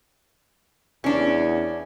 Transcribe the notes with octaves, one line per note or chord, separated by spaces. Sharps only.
E2 C#4 D4